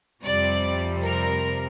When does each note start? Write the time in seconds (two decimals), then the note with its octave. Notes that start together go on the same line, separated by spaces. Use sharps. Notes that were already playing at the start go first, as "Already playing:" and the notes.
0.23 F2 C3 G3 D5
1.02 A#4